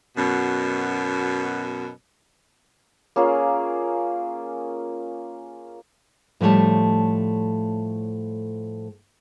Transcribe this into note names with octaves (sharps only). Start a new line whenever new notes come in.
F#2 B2
A#3 C#4 F4 G#4
A2 F3 G3 A3 C#5 A5